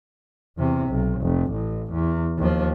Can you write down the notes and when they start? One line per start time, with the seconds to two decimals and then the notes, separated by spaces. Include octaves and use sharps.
0.57 E2 C3
0.90 B1
1.21 F1
1.53 A1
1.93 E2
2.38 D#2 F3